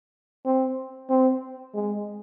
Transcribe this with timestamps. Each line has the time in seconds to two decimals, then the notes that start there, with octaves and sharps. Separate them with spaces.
0.45 C4
1.09 C4
1.74 G#3